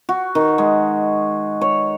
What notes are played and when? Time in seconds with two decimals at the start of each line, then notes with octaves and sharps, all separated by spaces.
0.09 F#4
0.35 D#3
0.58 G#3
1.61 C#5